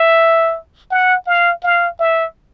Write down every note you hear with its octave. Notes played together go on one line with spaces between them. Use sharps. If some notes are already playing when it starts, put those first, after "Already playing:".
Already playing: E5
F#5
F5
F5
E5